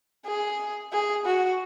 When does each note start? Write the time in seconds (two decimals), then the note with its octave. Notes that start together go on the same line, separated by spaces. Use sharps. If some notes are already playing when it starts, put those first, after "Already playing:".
0.26 G#4
0.92 G#4
1.26 F#4